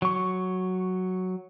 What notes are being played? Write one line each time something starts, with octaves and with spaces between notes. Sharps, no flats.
F#3 C#6